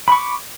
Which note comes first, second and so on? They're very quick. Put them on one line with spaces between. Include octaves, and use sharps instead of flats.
B5 C#6 D6